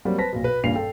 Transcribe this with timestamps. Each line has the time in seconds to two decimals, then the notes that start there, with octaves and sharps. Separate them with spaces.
0.05 F#3 G3 A#3 C4
0.18 B4 C5 A5 A#6 B6
0.32 B1 A#2
0.44 B4
0.63 D#1 G2 A#2 C7 F7
0.75 A4 G5